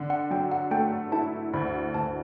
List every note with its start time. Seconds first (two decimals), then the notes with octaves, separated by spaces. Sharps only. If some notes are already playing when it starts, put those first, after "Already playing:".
Already playing: D3
0.10 F#5
0.31 F#3 G5
0.52 F#5
0.71 A3 G5
1.12 E4 A5
1.53 D2 B5
1.94 D2 A5